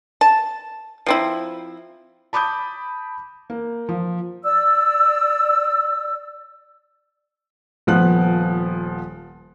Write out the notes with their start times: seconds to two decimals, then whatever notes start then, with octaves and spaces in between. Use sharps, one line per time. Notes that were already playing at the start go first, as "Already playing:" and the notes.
0.21 A5
1.06 F3 C4 E4
2.33 A5 B5 D6 D#6 G6
3.50 A#3
3.89 F3
4.44 D5 E6
7.87 D#1 F3 B3 F#6